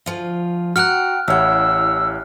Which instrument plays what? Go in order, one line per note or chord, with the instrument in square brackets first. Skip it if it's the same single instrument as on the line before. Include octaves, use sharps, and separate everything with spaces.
[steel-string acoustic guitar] D2 F3 F4
[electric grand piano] F#4 [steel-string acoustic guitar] F#5 G5 A#5 [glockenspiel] F6 F#6
[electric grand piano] A1 C#5 F#5 [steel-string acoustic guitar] E4 G4 [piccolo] E6